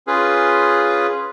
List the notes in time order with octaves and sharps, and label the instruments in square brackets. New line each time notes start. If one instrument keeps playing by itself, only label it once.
[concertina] C#4 F4 G#4 B4